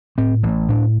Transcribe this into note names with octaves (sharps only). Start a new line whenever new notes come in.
A2 C4
A1
A2 D4